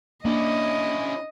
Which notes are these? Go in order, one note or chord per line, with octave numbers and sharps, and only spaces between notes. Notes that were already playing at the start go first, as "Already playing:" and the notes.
A#3 C#4 D4 E4 D#5